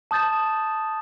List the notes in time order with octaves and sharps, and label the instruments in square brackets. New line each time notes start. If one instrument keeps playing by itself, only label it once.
[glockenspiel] A5 D#6 G6 A6 E7